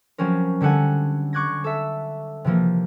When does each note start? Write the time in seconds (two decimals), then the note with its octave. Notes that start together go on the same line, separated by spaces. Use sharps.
0.18 F3 F#3 C4 C#4 A#4
0.61 D3 G3 A4 F#5 G#5
1.33 C#6 D6 F#6 G#6 A#6
1.64 A4 E5
2.45 C3 E3 F3 A#3